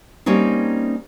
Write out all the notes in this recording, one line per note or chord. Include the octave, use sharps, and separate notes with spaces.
G3 A#3 C4 C#4 D#4